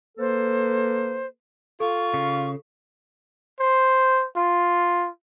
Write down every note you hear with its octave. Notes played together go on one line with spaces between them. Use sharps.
A#3 A4 B4 C5
F4 A4 C#6
C#3
C5
F4